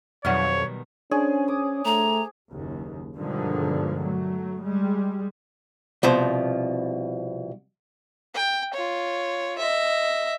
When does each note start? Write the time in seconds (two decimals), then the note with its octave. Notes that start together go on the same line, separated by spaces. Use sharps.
0.25 F2 B2 D#3 F#3 G3 C#5 D5 F#5
1.11 C#4 D4 G#4 C5 C#5
1.48 D6 D#6
1.85 A3 A#5
2.52 F#1 D#2
3.16 G2 B2 D3 D#3 F3 G#3
4.03 F#3 A3
4.62 G3 G#3
6.03 C2 B2 F3 C5
8.34 G5
8.74 F4 C#5
9.58 D#5 E5